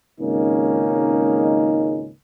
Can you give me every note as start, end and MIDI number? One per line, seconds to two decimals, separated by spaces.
0.19 2.09 32
0.19 2.09 37
0.19 2.09 58
0.19 2.09 61
0.19 2.09 63